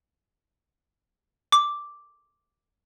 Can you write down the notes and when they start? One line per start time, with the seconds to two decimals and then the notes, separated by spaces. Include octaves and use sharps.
1.52 D6